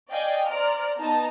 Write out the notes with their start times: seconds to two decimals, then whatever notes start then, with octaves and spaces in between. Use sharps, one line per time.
0.11 D5 D#5 F5 G5 G#5
0.48 C5 D5 A#5 F6 D7
0.98 B3 D#4 A5 A#5